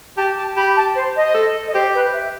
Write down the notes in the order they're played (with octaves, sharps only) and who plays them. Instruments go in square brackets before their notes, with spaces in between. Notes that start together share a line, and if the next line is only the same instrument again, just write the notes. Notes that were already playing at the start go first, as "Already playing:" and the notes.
[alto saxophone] G4 [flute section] A5
[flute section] A5
[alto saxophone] G4 [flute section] B5
[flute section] A5
C5
D#5
[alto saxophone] A4
[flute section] D#5
[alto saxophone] G4 [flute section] C5
[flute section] B4
E5